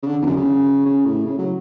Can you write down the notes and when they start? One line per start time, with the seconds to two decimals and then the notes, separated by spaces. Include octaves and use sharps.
0.03 C#3
0.07 D3
0.22 E2
0.26 F#2
0.37 C#3
0.86 C#3
1.05 A2
1.25 C#3
1.38 F#3